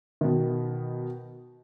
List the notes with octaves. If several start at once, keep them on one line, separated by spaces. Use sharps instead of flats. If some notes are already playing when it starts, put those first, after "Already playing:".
B2 D#3